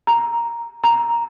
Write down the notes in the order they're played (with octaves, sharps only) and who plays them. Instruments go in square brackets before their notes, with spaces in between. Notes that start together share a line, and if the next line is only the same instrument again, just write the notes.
[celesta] A#5
A#5